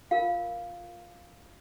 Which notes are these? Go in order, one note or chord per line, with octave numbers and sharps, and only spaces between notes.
F4 A#4 F5